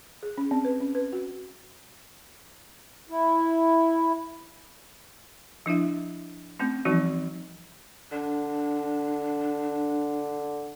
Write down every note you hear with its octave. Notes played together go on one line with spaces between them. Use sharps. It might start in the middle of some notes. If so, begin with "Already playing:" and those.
G#4
C#4
C4
B4
C#4
B4
F#4
E4
F3 D4 E4 E5
A3 C4 C#4
E3 F3 G3 C4 D#4 F#4
D3 D4